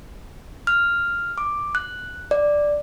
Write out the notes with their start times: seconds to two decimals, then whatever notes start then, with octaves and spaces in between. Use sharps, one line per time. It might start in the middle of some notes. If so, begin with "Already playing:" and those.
0.67 F6
1.38 D6
1.75 F#6
2.31 D5